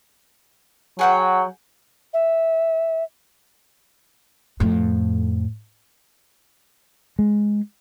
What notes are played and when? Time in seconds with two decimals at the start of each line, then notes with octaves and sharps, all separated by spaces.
0.99 F#3 G#4 F#5 G5
2.13 E5
4.60 F2 A2
7.19 G#3